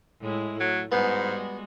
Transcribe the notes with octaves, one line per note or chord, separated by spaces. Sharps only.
A2 G#3 E4
F#3 A3
G#2 G3 G#3 B3 F#4